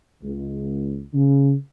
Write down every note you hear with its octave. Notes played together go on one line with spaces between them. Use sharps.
C#2
C#3